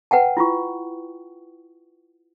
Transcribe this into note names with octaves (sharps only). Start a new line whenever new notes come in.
B4 F#5 G5 A5
E4 F4 C#6